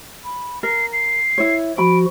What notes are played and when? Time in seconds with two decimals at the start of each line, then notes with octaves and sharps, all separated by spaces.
0.24 B5
0.63 A#4 C7
0.93 C7
1.38 E4 C#5
1.78 F3 F#4 B5 D7